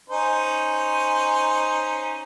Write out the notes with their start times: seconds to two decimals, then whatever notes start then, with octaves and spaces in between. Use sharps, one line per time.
0.09 C#4 D#4 C5